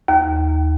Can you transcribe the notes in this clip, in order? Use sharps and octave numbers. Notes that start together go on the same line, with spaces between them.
D#2